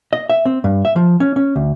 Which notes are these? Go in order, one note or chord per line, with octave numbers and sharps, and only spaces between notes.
D#5
E5
C4
G2
E5
F3
C#4
C#4
D2